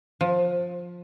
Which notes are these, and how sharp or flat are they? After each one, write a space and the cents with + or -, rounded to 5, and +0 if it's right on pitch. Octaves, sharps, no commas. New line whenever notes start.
F3 +15